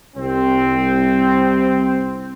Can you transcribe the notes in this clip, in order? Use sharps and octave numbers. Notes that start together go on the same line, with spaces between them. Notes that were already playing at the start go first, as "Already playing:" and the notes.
C2 C4